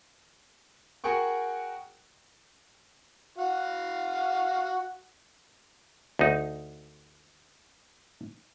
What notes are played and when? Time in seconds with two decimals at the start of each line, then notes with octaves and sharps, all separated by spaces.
1.04 F#4 G#4 A#4 F#5 G5 C#6
3.38 F#4 F5 F#5
6.19 D2 D#4